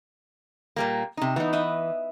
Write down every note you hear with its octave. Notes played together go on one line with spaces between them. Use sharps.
A#2 G3 A#3
C3 D#4
E3 B3 D#4
B4 D#5 E5